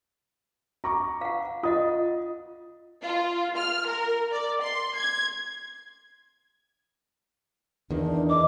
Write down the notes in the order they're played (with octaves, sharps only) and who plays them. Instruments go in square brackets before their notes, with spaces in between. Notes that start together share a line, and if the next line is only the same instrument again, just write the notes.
[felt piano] A#5 C#6 D6
[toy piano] F5 F#5
[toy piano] F4 D#5 F#5 [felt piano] D#6
[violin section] F4
F6
A#4
D5
C6
G#6
[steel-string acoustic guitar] E2 D#3 [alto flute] D4
[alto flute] D#5 [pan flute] D6